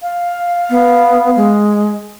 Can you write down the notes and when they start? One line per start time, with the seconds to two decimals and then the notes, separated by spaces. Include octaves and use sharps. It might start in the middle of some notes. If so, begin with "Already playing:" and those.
0.01 F5
0.70 B3
1.36 G#3